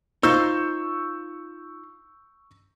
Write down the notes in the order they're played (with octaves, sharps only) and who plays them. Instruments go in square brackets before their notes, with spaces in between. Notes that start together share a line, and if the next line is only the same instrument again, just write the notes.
[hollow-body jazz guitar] D#4 F4 C5 [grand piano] C#6 E6 G6